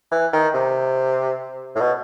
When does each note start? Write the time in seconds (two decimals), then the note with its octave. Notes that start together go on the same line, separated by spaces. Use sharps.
0.11 E3
0.33 D#3
0.54 C3
1.75 A2
1.81 B2